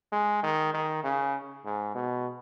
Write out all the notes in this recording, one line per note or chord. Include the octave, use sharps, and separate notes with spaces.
G#3
D#3
D#3
C#3
G#2
B2